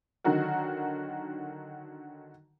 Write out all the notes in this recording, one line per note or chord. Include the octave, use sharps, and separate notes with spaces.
D3 D#3 F#3 F#4 A#4